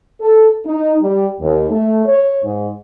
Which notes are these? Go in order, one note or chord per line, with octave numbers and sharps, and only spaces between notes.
A4
D#4
G3
D#2
A3
C#5
G#2